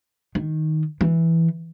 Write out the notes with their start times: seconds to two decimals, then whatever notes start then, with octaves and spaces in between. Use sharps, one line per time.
0.35 D#3
1.01 E3